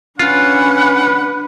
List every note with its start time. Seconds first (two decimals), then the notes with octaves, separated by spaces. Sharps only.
0.19 C#4 D4 F4 B4 F#5